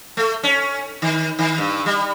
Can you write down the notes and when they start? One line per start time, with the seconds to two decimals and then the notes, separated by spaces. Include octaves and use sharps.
0.17 A3
0.43 C#4
1.02 D#3
1.39 D#3
1.58 G2
1.86 G3